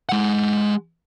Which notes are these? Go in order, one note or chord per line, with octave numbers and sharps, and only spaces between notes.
G#3 F#5